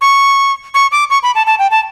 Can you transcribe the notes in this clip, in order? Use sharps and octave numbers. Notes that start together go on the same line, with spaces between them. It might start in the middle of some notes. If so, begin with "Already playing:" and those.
C#6
C#6
D6
C#6
B5
A5
A5
G5
A5